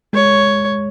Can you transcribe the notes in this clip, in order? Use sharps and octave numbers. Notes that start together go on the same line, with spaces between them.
G#3 C#5